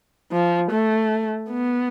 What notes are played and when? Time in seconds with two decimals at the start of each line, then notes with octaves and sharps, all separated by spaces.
0.32 F3
0.71 A3
1.50 B3